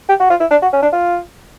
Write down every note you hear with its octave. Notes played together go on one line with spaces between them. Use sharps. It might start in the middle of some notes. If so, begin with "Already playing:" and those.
G4
F#4
F4
E4
D4
F#4
C#4
D4
F4